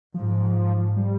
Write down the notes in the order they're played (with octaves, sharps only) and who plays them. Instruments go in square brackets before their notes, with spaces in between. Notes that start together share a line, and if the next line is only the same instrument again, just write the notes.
[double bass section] G#2 [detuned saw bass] F3
[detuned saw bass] G3